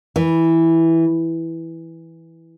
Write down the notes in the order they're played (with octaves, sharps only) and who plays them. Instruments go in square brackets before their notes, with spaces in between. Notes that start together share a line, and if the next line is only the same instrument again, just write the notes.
[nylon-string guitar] E3